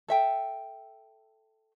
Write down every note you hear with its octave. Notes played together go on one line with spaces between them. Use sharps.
A4 E5 G5